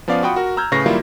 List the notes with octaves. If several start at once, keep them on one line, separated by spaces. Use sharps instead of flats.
F3 B3 C#4 D5 F5
F4 F#4 F#5 G5 B5 D#6
F#4 A#4
A#5 E6 F6 G6 G#6
A2 C#3 B4 C#6 A#6
D#3 F#3 G3 A#3 E4 F4